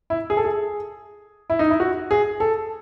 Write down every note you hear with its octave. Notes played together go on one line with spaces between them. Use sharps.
E4
G#4
A4
G#4
E4
D#4
E4
F#4
G#4
A4